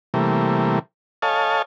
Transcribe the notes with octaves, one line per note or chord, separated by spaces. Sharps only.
C3 E3 G3 A3 A#3
A4 C#5 D#5 F5 G#5 A5